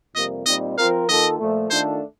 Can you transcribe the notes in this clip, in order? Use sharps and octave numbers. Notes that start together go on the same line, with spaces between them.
F2 C3 G3 A#3 D#5
A#2 G3 C4 D#4 D#5
F3 C4 F4 A#4 F5
D#3 A#3 F4 A4 D#5
A#2 F3 A3
D#3 A3 D4 F4 A4 C5